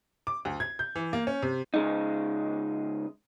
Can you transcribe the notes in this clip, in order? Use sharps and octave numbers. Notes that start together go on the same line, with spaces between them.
D6
D2
G#6
G6
E3
A#3
C#4
C3
C#3 G#3 D#4